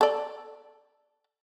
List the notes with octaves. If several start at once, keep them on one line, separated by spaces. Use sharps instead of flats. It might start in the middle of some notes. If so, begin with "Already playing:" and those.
A4 D5